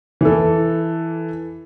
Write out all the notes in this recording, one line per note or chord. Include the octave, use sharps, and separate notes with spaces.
E3 A4